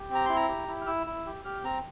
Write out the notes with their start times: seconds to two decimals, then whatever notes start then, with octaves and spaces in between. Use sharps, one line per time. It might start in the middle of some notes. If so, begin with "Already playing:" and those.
Already playing: G4
0.10 C4 A#5
0.26 E4 C6
0.36 A#5
0.49 G4
0.68 E4
0.81 F6
0.87 E4 E6
1.07 E4
1.26 G4
1.45 G4 F6
1.64 C4 A#5